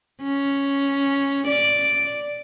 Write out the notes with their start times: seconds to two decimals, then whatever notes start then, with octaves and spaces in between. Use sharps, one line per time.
0.23 C#4
1.47 D5